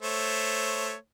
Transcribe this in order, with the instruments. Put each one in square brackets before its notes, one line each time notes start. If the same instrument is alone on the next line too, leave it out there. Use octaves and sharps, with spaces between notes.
[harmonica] A3 C5 C#5